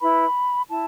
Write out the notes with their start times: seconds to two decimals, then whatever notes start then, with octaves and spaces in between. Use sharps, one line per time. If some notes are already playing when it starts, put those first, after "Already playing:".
0.01 E4 B4 B5
0.70 E4 A5